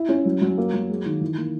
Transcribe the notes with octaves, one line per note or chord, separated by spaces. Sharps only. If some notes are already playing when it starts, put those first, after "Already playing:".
Already playing: E4
C#4
F#3
F#3
A#3
F#3
G#3
D#3
E3
A#3